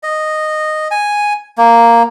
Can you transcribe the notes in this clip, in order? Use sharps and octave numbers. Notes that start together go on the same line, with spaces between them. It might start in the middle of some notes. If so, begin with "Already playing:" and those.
D#5
G#5
A#3